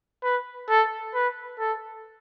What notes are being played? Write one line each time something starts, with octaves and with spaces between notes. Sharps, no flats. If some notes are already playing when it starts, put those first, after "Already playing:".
B4
A4
B4
A4